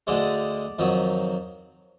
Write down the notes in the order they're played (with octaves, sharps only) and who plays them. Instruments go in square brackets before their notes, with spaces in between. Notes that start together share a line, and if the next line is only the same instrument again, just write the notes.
[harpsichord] D2 D3 G#3 D5
F2 D#3 F#3